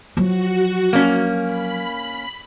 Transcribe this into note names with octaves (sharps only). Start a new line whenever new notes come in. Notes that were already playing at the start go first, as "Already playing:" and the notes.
F3 F#3 F#4
A#3 C#4
B5